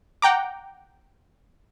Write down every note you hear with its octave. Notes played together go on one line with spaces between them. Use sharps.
F#5 G5 A#5 D6